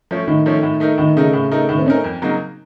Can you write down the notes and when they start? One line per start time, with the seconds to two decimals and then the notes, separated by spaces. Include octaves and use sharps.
0.11 F3 A3 C#4
0.27 A2 D#3
0.46 F3 A3 C#4
0.63 A2
0.80 A3 D#4 A#4
0.98 A2 D#3
1.16 C#3 A3 D#4 A#4
1.33 A2
1.52 A3 D#4 A#4
1.69 A2 D#3
1.78 C4
1.86 A3 C#4 D#4 A#4
2.04 F2
2.22 C#3 F#3 A#3 D#4